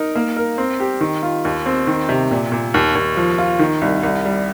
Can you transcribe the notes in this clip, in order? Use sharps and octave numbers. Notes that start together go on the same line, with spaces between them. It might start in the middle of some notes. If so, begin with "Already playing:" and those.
Already playing: D#4 A#4
A#3
A#4
C4
G4
D#3
F4
D#2
C4
D#3
C3
A#2
A#2
D#2
D#2
F3
F4
D#3
C2
C2
G3